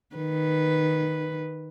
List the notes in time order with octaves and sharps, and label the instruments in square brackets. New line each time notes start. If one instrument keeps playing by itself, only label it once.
[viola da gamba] D#3 B4